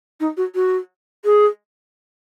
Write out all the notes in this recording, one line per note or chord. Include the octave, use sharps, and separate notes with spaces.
D#4
F#4
F#4
G#4